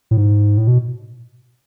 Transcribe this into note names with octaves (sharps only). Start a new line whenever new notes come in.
A2
G#2
A2
B2